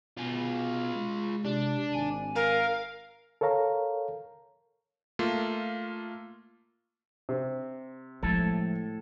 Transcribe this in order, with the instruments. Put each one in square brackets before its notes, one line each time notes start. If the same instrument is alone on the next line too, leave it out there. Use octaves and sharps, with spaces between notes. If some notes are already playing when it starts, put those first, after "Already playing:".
[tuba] B2 [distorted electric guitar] F4 G#4
[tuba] G#3
[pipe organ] C3 [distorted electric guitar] D4
[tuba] G#1 [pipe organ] G#5
[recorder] A#4 [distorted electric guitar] F5
[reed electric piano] A4 A#4 C#5 F5 A#5
[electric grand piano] A3 A#3 F4
[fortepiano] C3
[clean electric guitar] A2 A4 [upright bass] F3 G#3